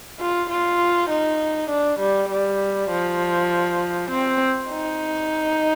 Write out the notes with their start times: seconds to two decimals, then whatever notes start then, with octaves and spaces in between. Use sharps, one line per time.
0.20 F4
0.50 F4
1.10 D#4
1.70 D4
1.99 G3
2.29 G3
2.90 F3
4.11 C4
4.70 D#4